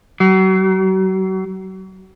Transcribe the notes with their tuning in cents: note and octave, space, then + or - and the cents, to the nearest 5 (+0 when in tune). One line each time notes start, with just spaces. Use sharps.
F#3 +35